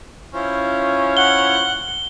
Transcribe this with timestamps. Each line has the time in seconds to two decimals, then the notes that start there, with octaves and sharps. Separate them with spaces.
0.34 C#4 E4 F4 C5
1.17 F#5 G7